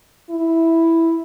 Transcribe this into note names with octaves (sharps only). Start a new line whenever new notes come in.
E4